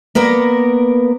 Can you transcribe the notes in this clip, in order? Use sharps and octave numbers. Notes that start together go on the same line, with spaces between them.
A#3 B3 A#4 D5